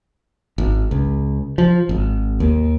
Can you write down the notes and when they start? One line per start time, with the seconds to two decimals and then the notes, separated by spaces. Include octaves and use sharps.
0.58 G#1
0.91 C#2
1.58 F3
1.89 G#1
2.40 D#2